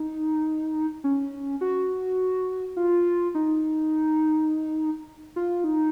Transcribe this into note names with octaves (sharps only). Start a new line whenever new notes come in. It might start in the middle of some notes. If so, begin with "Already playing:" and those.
Already playing: D#4
C#4
F#4
F4
D#4
F4
D#4